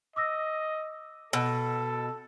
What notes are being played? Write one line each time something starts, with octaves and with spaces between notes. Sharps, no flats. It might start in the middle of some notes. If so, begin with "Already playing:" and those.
D#5 D6 E6 A#6
B2 A4 E6